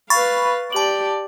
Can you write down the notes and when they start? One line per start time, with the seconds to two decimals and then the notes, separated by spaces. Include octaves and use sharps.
0.10 B4 F5 B5 C#6 A6
0.72 G4 D5 A5 F#7